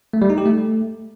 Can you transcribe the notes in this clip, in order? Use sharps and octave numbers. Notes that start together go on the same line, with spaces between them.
A3
G3
D#4
G4
A3